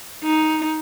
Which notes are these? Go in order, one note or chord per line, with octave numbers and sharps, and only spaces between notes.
D#4